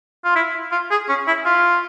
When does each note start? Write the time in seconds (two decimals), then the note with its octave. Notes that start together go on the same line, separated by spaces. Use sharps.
0.25 F4
0.36 E4
0.71 F4
0.91 G#4
1.09 C#4
1.27 E4
1.45 F4